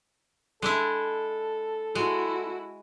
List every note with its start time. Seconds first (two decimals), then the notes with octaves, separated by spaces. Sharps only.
0.62 G#3 D4 E4 A4
1.95 G#3 E4 F#4